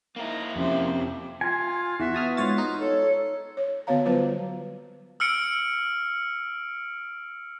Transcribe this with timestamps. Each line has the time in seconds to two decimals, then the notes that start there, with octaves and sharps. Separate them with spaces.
0.16 A#3 D#4 E4 A#5
0.56 F2 C3 C#4 G4 C5 E5
1.41 F4 G#5
2.00 E2 F#4 E5
2.14 B3 A5 D#6 F6
2.37 G#2 F4 C#5 A6
2.58 D#4
2.80 A4 C#5
3.57 C#5
3.87 D3 B3 F#4 C#5 F5 A#5
4.05 F#3 G3 B3 F4 B4 C5
5.20 E6 F6 C#7 D7